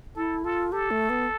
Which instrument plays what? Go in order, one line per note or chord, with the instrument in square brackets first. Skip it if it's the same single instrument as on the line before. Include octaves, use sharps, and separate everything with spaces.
[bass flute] E4 [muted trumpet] A4
[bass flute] F4 [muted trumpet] A4
[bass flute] G4 [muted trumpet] A4
[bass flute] A3
B3